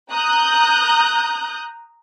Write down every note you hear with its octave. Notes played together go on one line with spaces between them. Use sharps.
A#5 D#6 F#6 G6